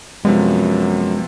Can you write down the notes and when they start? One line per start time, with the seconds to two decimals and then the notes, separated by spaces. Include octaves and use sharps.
0.25 F#2 C3 F3 G#3 B3